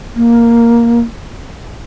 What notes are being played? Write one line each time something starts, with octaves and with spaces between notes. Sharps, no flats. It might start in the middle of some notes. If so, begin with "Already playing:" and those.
A#3